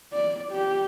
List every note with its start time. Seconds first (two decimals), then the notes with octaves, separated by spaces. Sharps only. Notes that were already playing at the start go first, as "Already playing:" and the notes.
0.13 D5
0.52 G4